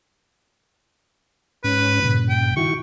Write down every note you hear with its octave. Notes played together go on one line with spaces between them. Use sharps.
G#2 C#4 B4
G2 A#2 C#3
G5
D#3 E4 F#4 C#6